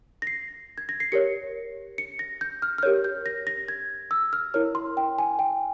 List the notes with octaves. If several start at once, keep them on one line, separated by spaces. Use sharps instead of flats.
A#6
C7
G#6
A#6
C7
G4 A#4 C#5 C#7
C#7
A#6
G6
F6
F6
G4 A#4 C#5 G6
G6
A#6
A#6
G#6
E6
F6
E4 A#4 C#5 F6
C6
G5
G#5
G5